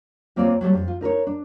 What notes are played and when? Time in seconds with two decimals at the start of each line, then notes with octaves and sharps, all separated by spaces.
0.36 D#2 A#3 C4 F4 C#5 D5
0.61 F#3 G3 A3
0.73 F2
0.88 F4
1.01 D#4 A#4 B4 C#5
1.27 D4